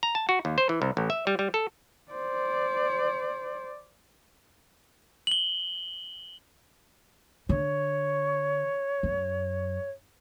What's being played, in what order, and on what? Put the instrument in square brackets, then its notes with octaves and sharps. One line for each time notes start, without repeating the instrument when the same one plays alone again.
[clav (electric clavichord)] A#5
A5
F#4
D#2
C5
E3
C2
A1
E5
G3
G3
A4
[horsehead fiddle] C5 D5
[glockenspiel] F#7 G7
[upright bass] D3 [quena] C#5
[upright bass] F#2